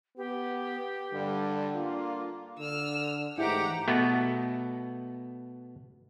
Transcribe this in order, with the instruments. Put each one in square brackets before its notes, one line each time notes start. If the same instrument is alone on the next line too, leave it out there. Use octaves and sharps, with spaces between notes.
[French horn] B3 [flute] G4
[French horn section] G2 G3 [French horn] D3
[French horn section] A#3 D4 F4
[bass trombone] D3 [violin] E6 F6
[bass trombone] G#2 [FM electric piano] E3 A3 [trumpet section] G4 [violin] F#5 A#5
[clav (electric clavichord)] B2 A3 B3